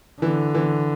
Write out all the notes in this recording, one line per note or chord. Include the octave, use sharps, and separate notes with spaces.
D3 E3
E3